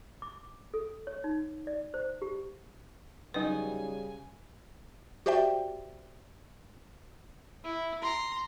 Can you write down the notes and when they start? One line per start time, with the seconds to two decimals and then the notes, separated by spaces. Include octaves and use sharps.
0.22 D6
0.74 A4
1.07 C#5
1.24 D#4
1.67 D5
1.94 C5
2.22 G4
3.34 C#3 F#3 G3 D#4 B4 G#5
5.26 F#4 G4 C5 D5 E5 G5
7.64 E4
8.01 A#5 C6